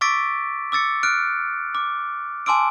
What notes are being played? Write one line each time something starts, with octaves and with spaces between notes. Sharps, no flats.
C#6 D6 E6 A6 B6 D7
D6 E6 A6 C#7
F6 F#6 D7
D6
G#5 A5 C6 D6 E6 D7